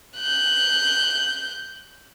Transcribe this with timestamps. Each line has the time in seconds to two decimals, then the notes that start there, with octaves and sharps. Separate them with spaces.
0.17 F#6 G6